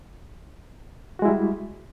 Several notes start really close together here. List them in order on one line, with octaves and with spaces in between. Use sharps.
F#4 G#3 E4 G3